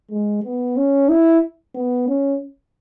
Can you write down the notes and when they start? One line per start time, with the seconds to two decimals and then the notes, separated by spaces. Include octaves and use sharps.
0.11 G#3
0.44 B3
0.77 C#4
1.09 E4
1.75 B3
2.08 C#4